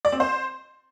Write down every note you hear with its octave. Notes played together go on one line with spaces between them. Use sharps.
D5
C4
C5